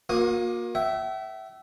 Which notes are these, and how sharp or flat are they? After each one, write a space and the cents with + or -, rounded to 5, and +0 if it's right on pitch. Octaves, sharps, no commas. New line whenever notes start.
A#3 +20 F#4 -45 D#6 +0
E5 +0 G5 -45